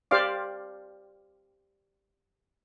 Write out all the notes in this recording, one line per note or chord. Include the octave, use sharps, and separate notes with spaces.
G4 C5 D5 F5 D6